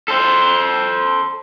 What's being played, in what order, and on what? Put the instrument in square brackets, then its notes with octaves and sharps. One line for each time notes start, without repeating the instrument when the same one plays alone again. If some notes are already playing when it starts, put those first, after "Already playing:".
[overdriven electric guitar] A4 C5